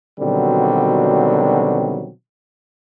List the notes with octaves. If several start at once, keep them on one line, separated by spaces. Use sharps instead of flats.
B2 D3 D#3 F#3 G3 C4